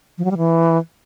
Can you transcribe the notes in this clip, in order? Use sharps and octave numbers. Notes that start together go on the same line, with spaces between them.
F3
F#3
G3
E3